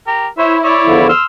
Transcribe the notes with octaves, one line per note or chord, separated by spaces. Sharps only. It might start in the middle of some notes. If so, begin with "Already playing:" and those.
G4 A#4
E4 C5 C#5 E5
C#5 D5 E5
E2 D3 F3
C6 E6 F6